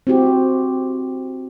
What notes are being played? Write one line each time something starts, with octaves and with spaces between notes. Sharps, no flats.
C4 E4 F#4 G4